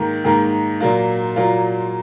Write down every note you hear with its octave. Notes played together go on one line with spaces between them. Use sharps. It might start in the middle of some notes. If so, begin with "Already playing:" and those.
Already playing: G#2 D#3 A#3
G#2 D#3 A#3
A#2 F#3 A#3 F4
A#2 F#3 A#3 F4